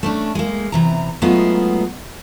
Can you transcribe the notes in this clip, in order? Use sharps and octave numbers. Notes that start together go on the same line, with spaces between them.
A3 C#4 D4
G#3 A#3
C3 E3 A#5
F#3 G#3 A3 B3 D#4 F4